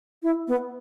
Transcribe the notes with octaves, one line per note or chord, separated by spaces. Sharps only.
E4
B3